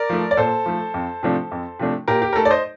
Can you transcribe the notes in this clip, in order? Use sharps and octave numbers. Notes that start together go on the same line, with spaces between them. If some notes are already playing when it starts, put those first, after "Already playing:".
Already playing: A#4 D5
F3 A3
D5
A#2 A4 C5
F3 A3
F2
C3 F3 A3 D4
F2
C3 F3 A3 D4
A#2 G4 A#4
G4
A#4
A3 D#4 A4
D5
C5 D#5